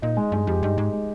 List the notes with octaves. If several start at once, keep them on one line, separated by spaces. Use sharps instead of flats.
A#2 D#4
G#3
G2 G#3
F2 G4
G2 D#4
G#2 G#3
G#3